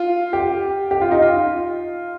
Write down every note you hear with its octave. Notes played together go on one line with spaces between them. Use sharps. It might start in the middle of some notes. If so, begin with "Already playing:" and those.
Already playing: F4
G4
G4
F4
D#4
F4